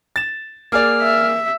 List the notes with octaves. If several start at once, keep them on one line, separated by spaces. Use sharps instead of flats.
A6 E7
A#3 G#4 D5 F6
E5